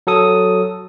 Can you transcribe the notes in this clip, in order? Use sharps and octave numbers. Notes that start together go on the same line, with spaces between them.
F#3 A4 D#6